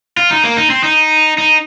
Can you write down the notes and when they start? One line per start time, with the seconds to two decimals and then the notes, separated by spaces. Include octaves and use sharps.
0.17 F4
0.31 D#4
0.44 A#3
0.57 D#4
0.70 C4
0.84 D#4
1.38 D#4